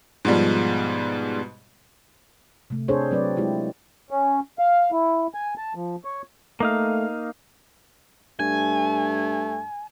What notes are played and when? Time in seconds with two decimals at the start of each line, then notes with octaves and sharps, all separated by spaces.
0.25 G#2 B2 F3 G3 G#3
2.70 C3 A3
2.88 C4 D4 G#4 A4 C5 C#5
3.11 F#3 C4 B4 D5
3.37 G#3 E4 F4 G4
4.10 C#4
4.59 F5
4.92 E4
5.34 G#5
5.57 A5
5.75 F3
6.05 C#5
6.60 A3 A#3 D#4 F5
8.40 G2 A3 G#5